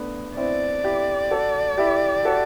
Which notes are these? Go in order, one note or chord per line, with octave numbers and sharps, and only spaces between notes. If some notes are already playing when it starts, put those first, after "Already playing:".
Already playing: A3 B3 D4
C4 E4 D5
E4 G4
F#4 A4
E4 G4
F#4 A4